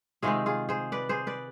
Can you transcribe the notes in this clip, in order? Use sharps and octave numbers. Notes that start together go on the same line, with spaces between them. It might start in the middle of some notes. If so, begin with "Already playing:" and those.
C3 D#3 G#3 C4 F4 G#4
F4 G#4
G#4 C5
B4 D5
G#4 C5
B4 D5